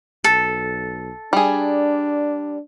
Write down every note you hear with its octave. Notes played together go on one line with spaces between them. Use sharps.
B1 A4
G3 D4 G#4